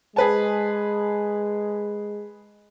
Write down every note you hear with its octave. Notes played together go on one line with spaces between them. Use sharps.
G#3 G#4 B4 A5